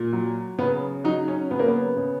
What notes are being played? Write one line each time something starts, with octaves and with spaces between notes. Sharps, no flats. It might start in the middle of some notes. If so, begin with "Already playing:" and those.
Already playing: A#2
F#3
C#3 B3
F#3 D#4
C#4
C#3 B3
A#3
B3
C#3